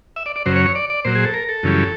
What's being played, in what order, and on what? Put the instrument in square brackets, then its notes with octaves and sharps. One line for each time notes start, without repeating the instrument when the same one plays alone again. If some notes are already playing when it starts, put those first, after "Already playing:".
[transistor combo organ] E5
D5
D5
F#2 C#3 F#3 C5
C#5
C#5
D5
D5
A#2 F#3 C5
G#4
A4
A#4
A4
F#2 C#3 E3 G3